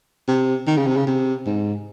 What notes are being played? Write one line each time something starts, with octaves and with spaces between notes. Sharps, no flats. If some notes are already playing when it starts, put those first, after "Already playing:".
C3
D#3
C#3
C3
C#3
C3
G#2